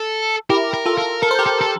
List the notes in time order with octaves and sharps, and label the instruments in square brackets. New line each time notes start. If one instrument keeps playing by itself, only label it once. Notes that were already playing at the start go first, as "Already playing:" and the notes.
Already playing: [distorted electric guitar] A4
[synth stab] E4 G4 [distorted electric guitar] A#4
[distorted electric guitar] A#4
[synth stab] F4 A4
[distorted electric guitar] A#4
[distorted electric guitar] A4 [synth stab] A#4
[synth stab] C5
G4 A#4
[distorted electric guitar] A4
A4